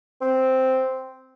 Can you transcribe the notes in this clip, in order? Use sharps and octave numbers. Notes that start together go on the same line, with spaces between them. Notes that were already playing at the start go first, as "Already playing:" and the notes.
C4